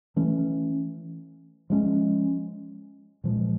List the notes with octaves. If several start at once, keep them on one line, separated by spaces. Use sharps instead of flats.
E3 A3 C#4
F3 G#3 C#4
A#2 F3 G#3